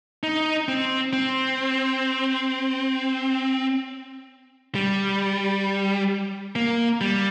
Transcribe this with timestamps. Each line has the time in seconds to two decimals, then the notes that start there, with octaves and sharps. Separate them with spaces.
0.23 D#4
0.68 C4
1.13 C4
4.75 G3
6.56 A#3
7.01 G3